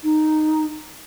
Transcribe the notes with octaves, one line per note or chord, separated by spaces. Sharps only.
D#4